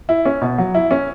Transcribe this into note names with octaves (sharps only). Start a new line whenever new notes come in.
E4
C#4
B2
F#3
E4
C#4